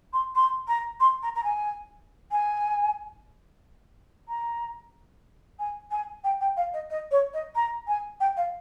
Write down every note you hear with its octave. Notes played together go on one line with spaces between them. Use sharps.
C6
C6
A#5
C6
A#5
A#5
G#5
G#5
A#5
G#5
G#5
G5
G5
F5
D#5
D#5
C#5
D#5
A#5
G#5
G5
F5